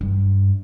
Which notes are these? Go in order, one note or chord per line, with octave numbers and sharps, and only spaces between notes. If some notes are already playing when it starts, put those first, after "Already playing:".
G2